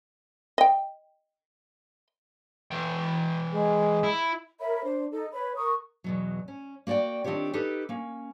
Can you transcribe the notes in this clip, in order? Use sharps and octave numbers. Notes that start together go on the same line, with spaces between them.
D#5 G5
E3 G5
G#3 G#4
E4
A#4 C#5 E5 B5
D4 C5
D#4 A4
B4 C#5 B5
A#4 C#6 D#6
E2 B2 F#3
C#4
A#3 F#4 C#5 D5 G5
D#3 C4 D4 F4 G4 C#5
D#4 G4 A4 B4
A#3 C#4